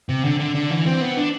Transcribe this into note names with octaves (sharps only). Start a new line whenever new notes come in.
C3
D3
D3
D3
E3
C4
B3
D4